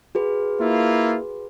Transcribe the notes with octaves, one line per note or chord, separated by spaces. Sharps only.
F#4 G#4 B4
A#3 E4 F4